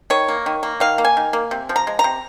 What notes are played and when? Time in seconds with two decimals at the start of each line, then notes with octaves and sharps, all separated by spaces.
0.10 D#3 C#5
0.28 A#3
0.46 D#3
0.63 A#3
0.80 D#3 F5
0.98 A#3
1.05 G#5
1.17 D#3
1.33 A#3
1.51 C3
1.69 F3
1.76 A#5
1.87 G#3
1.99 A#5
2.04 C3